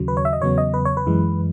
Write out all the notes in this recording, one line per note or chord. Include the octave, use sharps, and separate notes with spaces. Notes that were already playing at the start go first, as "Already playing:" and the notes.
Already playing: D#2 C#3 F#3
B4
C#5
E5
D#5
E2 C#3 F#3 B3 C#5
D#5
B4
C#5
B4
F#2 E3 G#3